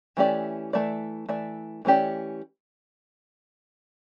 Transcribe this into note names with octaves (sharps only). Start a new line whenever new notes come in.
E3 A3 C#4 G4 D5
E3 A3 D5
E3 A3 D5
E3 A3 C#4 G4 D5